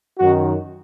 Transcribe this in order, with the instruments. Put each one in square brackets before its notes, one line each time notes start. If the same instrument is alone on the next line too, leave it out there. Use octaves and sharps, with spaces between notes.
[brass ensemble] F#2 D#3 F#4